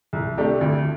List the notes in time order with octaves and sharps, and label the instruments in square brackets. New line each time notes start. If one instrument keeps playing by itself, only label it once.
[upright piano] C2
C3 A3 D4 G4
D2